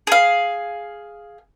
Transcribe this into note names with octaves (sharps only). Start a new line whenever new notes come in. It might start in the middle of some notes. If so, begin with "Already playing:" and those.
G#4 F5